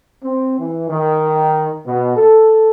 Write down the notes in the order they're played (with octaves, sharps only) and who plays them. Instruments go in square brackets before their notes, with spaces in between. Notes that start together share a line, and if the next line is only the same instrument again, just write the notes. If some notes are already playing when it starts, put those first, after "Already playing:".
[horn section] C4
E3
D#3
B2
A4